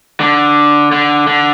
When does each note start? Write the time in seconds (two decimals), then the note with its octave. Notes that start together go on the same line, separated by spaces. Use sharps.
0.20 D3
0.92 D3
1.27 D3